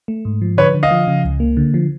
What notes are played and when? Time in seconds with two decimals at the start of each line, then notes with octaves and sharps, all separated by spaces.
0.08 A3
0.25 G#2
0.42 F3
0.57 D3 B4 C#5
0.74 D3
0.83 D#5 F5
0.91 F3
1.07 C#3
1.24 C#2
1.40 A#3
1.57 D3
1.74 F3